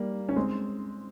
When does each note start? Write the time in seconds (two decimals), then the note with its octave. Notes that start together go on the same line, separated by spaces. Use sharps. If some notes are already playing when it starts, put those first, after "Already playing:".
Already playing: G3 A#3
0.29 C#4
0.36 G#3 C4